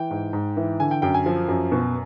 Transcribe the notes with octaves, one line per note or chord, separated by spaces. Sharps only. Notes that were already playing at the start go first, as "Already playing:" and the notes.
Already playing: E3 G5
G#2
G#2
E3
D3 G#5
G5
F#2 G5
G#5
F3
F#2
B2